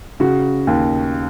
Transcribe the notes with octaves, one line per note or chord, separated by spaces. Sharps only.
C#3 F#4
D#2